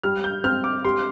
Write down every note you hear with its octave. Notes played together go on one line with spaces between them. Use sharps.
G3 F6
G6
C4 F6
D6
G4 C6